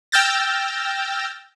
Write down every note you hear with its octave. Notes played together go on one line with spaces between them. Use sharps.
G5 E6 F6 G6 A6 A#6